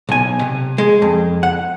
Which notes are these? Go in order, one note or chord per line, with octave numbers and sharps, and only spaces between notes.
B1 G#5
C3
G#3
F2
F#5